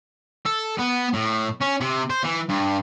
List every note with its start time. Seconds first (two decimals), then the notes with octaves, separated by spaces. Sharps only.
0.46 A4
0.79 B3
1.14 A2
1.61 C#4
1.81 C3
2.10 C5
2.24 E3
2.49 G2